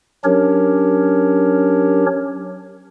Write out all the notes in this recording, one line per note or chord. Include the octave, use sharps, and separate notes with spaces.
F#3 C#4 D4 G4 A#4 C#5